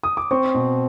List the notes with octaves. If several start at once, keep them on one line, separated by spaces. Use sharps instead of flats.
D#6
D6
C4 C#6
B2